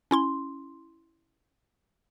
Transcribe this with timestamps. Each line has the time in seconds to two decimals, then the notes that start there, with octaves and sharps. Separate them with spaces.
0.11 C#4 E4 C6